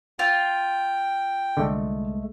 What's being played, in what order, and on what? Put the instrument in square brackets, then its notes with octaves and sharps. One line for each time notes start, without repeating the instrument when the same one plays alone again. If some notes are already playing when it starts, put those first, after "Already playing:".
[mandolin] F4 [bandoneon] G5
[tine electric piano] C2 G#3 A3 [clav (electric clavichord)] D3